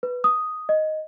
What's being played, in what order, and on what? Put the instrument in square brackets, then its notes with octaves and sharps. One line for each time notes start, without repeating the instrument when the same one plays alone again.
[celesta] B4
D#6
D#5